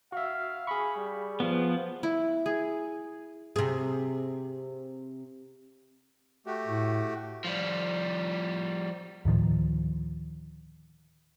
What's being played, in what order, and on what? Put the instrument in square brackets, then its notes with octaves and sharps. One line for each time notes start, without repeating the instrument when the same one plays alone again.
[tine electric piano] F#4 E5 [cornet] F5
[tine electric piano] G#4 C#6 [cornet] B5
[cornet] G3
[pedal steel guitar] F3 B3
[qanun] E4
G#4
[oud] C3 G#4
[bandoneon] A3 F#4 G4
[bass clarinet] A2
[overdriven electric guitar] F3 G3
[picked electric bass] D2 A2 D#3 F3